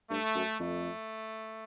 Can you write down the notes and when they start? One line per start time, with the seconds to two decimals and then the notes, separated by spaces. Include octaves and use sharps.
0.10 G2 A3
0.35 F#2
0.59 F2 A3